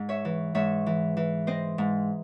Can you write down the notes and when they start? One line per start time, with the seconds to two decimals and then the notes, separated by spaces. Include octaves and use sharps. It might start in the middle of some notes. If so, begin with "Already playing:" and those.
Already playing: G#2 G#5
0.09 C#5 E5
0.25 E3
0.55 G#2 C#5 E5
0.86 E3
1.17 E3
1.47 C4 C5 D#5
1.78 G#2